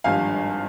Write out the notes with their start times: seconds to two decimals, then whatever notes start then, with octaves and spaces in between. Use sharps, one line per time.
0.04 G#1 G2 F3 F5 G#5